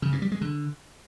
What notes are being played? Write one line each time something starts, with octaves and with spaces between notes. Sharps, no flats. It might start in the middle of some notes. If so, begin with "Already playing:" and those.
C#3
G2
G3
G#3
D3